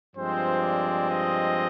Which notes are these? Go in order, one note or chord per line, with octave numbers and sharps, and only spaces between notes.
G2 F3 G#3 C4 C5
D5
D#5